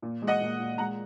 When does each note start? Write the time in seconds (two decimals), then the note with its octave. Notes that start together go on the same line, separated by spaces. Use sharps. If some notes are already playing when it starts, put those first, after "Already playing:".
0.02 A#2
0.22 G#3
0.27 D#5 F#5
0.41 A#2
0.60 A#2
0.78 G#3 F#5 A#5